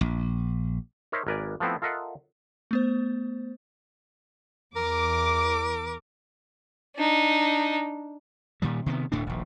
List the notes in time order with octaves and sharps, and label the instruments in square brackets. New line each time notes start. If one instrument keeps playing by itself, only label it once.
[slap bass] A#1
[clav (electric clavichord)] D#4 A#4 C5 C#5 E5
G#1 A#4 B4 D5 G#5
F3 A3 B3 C4 E4
F4 A4 A#4 D#5 E5 F#5
[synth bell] A3 B3 C5
[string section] E2 D6 [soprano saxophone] A#4
[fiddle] D4 D#4
[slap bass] A#2 D#3 G3
C3 D#3 B3
D1 A2 A3 D4
D#1 A#1